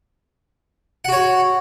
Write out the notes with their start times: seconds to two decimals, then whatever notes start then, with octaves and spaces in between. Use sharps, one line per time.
1.05 F#5
1.08 F#4
1.12 C#5